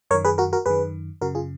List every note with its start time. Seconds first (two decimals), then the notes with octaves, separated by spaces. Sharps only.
0.10 F#2 A#4 C#5
0.14 D#3
0.25 G#4 B4
0.38 F#4 A#4
0.53 F#4 A#4
0.66 F#2 D#3 G#4 B4
1.21 F#2 C#3 F#4 A#4
1.35 F4 G#4